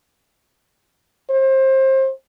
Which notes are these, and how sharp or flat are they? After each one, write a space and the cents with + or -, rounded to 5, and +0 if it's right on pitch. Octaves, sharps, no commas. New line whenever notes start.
C5 +25